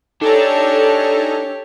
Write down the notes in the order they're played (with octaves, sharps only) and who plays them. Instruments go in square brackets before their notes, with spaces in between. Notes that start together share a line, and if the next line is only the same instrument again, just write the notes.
[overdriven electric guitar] D4 [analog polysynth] D#4 G#5 A#5 [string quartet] G4 C#5 [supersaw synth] A4